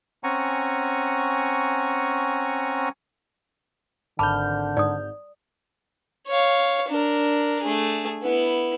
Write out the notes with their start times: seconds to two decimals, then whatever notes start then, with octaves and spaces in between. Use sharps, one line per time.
0.24 C4 C#4 F#5 G#5 A#5 C#6
4.19 G#1 D3 A5 B5 D6 F6 G6
4.77 G#2 D5 D#6
6.27 C#5 F5
6.88 D4 A#4
7.63 A3 G#4
8.23 B3 E4